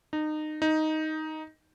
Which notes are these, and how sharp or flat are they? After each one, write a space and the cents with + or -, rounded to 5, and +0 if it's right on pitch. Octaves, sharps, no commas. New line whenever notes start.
D#4 -25
D#4 +5